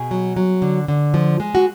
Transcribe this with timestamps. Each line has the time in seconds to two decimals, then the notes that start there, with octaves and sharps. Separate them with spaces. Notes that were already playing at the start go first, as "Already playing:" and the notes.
Already playing: B2 G#4
0.11 F#3
0.37 F#3
0.62 D3
0.88 D3
1.14 F3
1.40 G#3
1.55 F#4